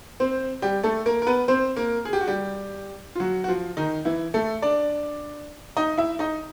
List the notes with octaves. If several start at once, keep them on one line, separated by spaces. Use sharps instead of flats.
C4 C5
G3 G4
A3 A4
A#3 A#4
A#4
B3 B4
C4 C5
A#3 A#4
G#4
G4
F#4
G3 G4
F4
F#3 F#4
F#4
F3 F4
D#3 D#4
E3 E4
A3 A4
D4 D5
D#4 D#5
E4 E5
D#4 D#5